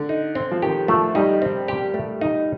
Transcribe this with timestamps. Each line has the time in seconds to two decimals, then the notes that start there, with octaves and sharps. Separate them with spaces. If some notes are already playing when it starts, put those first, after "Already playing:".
Already playing: D3
0.09 D#4
0.35 C4
0.51 F3
0.62 D#3 G4
0.88 F3 A3
1.15 G3 D#4
1.42 C4
1.68 G4
1.94 A3
2.21 D#4